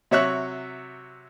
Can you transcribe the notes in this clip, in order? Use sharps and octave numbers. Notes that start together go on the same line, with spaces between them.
C3 F#3 C#5 E5 C#6 F#6